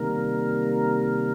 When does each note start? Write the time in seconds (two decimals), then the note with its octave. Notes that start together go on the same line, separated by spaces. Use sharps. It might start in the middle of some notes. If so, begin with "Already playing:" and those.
Already playing: C3 D#3 G3 A#3 A#4